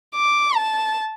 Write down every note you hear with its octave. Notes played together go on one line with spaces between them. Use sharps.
D6
A5